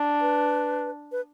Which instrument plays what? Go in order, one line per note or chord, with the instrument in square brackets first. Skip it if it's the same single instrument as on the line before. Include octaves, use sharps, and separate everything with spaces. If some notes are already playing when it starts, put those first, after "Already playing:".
Already playing: [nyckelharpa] D4
[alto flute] B4
B4